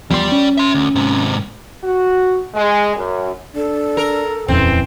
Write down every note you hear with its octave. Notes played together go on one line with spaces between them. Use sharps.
E2 F3 G3 D5 C6
C#4
E5 C6
D2
G#2 C3
F#4
G#3
F#2
D4 A4
A#4
D#1 F2 E3 C4 C#4